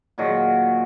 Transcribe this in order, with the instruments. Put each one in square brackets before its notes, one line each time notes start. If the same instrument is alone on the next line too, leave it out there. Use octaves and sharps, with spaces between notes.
[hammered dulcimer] A#2 D#3 F#3 G#3